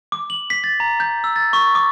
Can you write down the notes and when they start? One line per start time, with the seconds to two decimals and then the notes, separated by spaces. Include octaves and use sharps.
0.12 D6
0.30 F#7
0.50 B6
0.64 A6
0.80 A#5
1.00 G6
1.24 E6
1.36 A6
1.53 C#6
1.75 D6